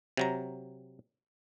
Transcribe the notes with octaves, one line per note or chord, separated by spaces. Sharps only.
C3 F#3 A#5